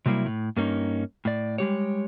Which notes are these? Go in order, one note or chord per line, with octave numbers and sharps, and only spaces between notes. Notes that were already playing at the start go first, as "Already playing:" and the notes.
C3 F#3 G3 A#3 E4
A2
G2 A#3 C#4 D#4
A2 D5
G3 G#3 G4 C#5